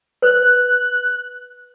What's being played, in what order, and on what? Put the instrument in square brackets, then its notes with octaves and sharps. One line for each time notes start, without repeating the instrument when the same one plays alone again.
[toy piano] B4 [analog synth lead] F#6